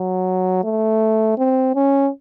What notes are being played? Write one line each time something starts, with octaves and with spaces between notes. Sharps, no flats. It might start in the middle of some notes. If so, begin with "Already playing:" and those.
Already playing: F#3
A3
C4
C#4